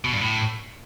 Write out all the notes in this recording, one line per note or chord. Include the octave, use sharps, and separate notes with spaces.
B2
G2
A2